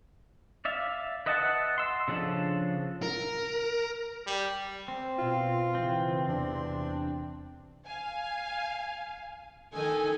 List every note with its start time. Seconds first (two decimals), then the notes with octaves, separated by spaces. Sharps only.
0.65 D5 E5 F5
1.26 B4 D#5 E5 F#5 A5
1.78 C6 E6
2.08 C#3 F3 D4 A4
3.02 A#4
4.27 G3
4.88 C4
5.18 B2 F4
5.75 C#3 E3 C4
6.29 E2 C3 D4
7.84 F5 G#5
9.74 D#3 D#4 A4 G#5